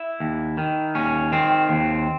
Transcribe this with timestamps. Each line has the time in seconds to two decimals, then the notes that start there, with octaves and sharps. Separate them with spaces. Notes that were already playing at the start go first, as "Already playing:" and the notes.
Already playing: E4
0.20 D#2
0.57 D#3
0.95 D#2 C#4
1.32 D#3 C4
1.69 D#2